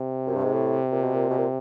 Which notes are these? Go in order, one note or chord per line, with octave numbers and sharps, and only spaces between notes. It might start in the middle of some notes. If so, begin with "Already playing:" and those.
Already playing: C3
F#2
G2
G#2
A2
A#2
B2
A#2
B2
A#2